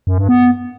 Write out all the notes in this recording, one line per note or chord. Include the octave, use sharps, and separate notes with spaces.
F#2
G2
B3